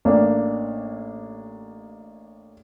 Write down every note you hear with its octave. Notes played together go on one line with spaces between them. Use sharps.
A1 A#3 D4